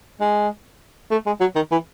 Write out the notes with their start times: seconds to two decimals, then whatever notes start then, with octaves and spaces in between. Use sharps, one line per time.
0.21 G#3
1.11 A3
1.26 G#3
1.40 F#3
1.55 D#3
1.72 E3